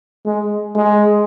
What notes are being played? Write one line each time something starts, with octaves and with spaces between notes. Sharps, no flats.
G#3
G#3